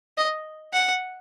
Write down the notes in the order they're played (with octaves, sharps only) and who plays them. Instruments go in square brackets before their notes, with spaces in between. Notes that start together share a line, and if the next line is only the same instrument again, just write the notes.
[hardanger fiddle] D#5
F#5